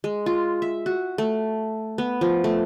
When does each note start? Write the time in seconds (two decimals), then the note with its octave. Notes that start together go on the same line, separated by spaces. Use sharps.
0.04 G#3
0.26 F4
0.62 E5
0.86 F#4
1.18 A3
1.98 B3
2.21 F3
2.44 A3